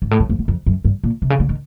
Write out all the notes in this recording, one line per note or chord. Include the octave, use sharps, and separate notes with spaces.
G#2
A2
G2
F2
E2
F2
F#2
G2
A#2
C3
C#3
D3
D#3